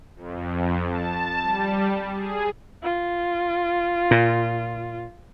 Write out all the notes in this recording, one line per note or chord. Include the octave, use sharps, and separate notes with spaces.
F2
A5
G3
G#4
F4
A#2